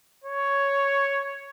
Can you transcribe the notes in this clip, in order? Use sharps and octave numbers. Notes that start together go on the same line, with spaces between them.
C#5